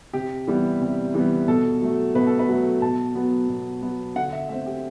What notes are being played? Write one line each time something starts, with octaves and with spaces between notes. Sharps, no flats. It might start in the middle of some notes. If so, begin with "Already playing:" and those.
C3 G4
E3 G3 B3
C3
E3 G3 B3
B2 A4
F#3 A3
B2 B4
A4
B4
F#3 A3
B2 A5
F#3 B3
B2
F#3 B3
D3 F#5
E5
A3 C4 E5
G4